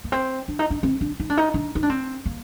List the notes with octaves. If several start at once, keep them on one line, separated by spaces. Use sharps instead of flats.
A#3
C4
D4
D#4
D4
C4
D4
D#4
D4
D#4
D4
D#4
D4
C4
A#3